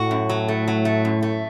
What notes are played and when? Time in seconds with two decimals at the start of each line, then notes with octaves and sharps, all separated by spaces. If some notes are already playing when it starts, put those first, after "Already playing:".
Already playing: A2 F#4
0.11 F#2
0.29 F#3
0.48 A3
0.68 F#3
0.85 A3
1.05 F#2
1.22 A3